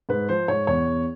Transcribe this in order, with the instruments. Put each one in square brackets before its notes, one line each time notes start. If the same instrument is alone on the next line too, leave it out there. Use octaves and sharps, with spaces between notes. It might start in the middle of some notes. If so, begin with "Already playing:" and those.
[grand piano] G#2 B4
F3 C5
G#2 C#5
E2 C#5
E2